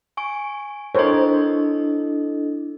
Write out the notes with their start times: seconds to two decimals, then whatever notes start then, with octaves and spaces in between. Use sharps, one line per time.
0.17 G#5 C#6 D7
0.95 D4 E4 A4 A#4 C5 C#5 D#5